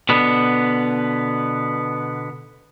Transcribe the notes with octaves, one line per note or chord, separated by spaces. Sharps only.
B2 D3 B3